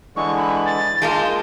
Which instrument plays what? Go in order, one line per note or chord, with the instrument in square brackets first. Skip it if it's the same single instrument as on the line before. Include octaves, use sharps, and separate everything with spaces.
[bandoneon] D3 E3 G#3 [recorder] C#6
[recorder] B5
A6
[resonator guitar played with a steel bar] G#3 A#3 F4 [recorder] A5 [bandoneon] G6